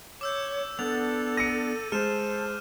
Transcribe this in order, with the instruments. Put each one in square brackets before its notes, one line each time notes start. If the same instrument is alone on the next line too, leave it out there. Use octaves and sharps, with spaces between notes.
[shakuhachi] C#5 [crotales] D6 E6 G6
[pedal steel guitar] B3 D4 [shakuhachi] A4 [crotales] F7
[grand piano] A#6 C#7 [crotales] D#7
[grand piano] G#3 [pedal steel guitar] A4 [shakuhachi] C5 [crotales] F6 E7